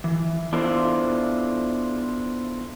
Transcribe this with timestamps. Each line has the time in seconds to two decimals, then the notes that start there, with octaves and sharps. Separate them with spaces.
0.04 E3
0.53 B3 D4 E4 F4 A4 C5